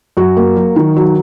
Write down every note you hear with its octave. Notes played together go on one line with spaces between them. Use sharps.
F#2 F#4
A#3
F#3
D#3
F#3